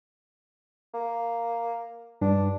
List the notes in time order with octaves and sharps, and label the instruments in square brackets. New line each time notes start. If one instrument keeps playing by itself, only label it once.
[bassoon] A#3
[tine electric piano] G2 [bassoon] D4